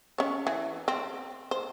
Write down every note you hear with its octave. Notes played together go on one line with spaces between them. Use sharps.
C#4 C#5
E3
C4
C5